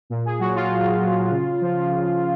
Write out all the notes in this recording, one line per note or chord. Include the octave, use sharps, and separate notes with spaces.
A#2
G#4
F#3 F#4
F4
A#2
F#3
C#3
F3
C#3